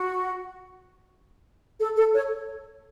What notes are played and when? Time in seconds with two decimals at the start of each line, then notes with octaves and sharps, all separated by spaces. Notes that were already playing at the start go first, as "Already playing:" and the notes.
Already playing: F#4
1.79 A4
1.96 A4
2.15 C#5